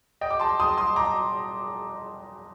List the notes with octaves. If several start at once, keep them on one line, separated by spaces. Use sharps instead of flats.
D#5 G5
D6
A5 C6
C6 D#6
C6 D#6
A#5 D6